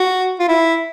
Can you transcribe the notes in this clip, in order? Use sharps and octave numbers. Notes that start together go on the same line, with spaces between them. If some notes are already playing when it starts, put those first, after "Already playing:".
Already playing: F#4
F4
E4